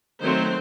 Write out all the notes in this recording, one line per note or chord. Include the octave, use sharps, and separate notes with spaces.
D#3 F#3 A3 C4 C5